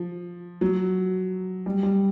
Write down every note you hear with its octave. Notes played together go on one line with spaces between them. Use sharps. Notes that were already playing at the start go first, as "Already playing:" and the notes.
Already playing: F3
F#3
G3
G3